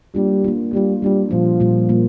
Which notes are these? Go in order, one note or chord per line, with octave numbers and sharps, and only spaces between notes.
G3 A#3 D4 F4
A#3 D4 F4
G3 A#3 D4 F4
G3 A#3 D4 F4
A#2 F3 G3 A#3 F4
A#2 G3 A#3 F4
A#2 G3 A#3 F4